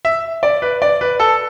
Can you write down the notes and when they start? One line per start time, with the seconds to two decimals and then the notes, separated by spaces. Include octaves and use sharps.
0.05 E5
0.43 D5
0.62 B4
0.82 D5
1.01 B4
1.20 A4